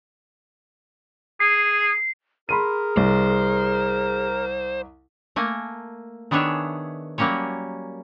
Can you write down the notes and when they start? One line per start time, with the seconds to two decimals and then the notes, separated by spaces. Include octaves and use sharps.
1.40 G#4 C7
2.49 G#4 A#4 B5 C6 D#7
2.97 C2 C5
5.36 A3 A#3 G#5
6.31 D#3 B3 D4 G#4 C#5 E5
7.18 F#3 G3 A#3 C#4 C#5